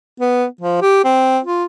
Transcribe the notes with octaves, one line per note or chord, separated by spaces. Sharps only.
B3
F3
G4
C4
F4